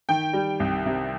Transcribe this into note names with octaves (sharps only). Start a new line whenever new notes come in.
D#3 G5
G3
C2
C3